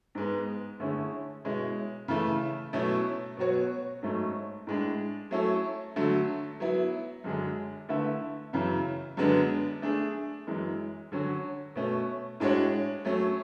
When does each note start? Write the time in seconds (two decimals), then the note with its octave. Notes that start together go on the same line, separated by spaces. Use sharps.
0.15 G#2 G#3 B3
0.80 D3 A3 C#4 E4 G#4
1.44 B2 G#3 C#4 E4
2.08 C#3 E3 A3
2.73 B2 F#3 A3 C#4 E4
3.37 B2 F#3 B3 F#4 C#5
4.02 G#2 F#3 A3 C#4
4.67 A2 G#3 D4
5.31 F#3 A3 C#4 E4 A4
5.96 D3 F#3 A3
6.60 F#3 B3 E4
7.24 F#2 D3 G#3 D4 G#4
7.89 D3 A3 E4 B4 E5
8.53 F#2 C#3 E3
9.17 F#2 D3 G#3 B3 D4
9.82 A3 D4 G#4
10.47 F#2 E3 G#3
11.12 D3 F#3 C#4 F#4
11.75 B2 A3 C#4
12.40 A2 G#3 D4 F#4 C#5
13.05 F#3 A3 C#4